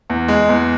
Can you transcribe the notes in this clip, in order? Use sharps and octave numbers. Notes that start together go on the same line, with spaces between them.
E2
G#3
E2